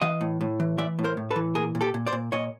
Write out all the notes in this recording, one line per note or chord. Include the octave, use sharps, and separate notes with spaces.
E3 D#5 F5
A2
A2
E3
E3 D5 E5
A2
A#4 C5
A2
A4 B4
E3
A#2 G#4 A#4
A#2
G4 A4
A#2
C5 D5
A#2
A#2 C#5 D#5